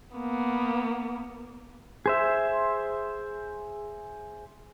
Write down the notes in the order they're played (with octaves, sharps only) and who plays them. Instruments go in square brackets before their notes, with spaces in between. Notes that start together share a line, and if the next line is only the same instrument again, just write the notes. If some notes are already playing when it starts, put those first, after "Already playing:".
[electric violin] A#3 B3
[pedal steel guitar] G#4 C5 E5